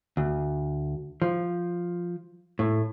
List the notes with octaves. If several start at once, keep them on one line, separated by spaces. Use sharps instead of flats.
D2
F3
A2